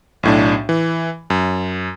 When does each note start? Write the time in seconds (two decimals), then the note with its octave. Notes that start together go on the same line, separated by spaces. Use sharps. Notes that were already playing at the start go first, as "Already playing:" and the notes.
0.23 B1 A2 D4
0.69 E3
1.30 F#2